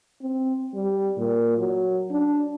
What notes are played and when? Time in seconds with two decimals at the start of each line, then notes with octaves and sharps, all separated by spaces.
0.22 C4
0.75 G3
1.17 A#2
1.58 F#3
2.10 D4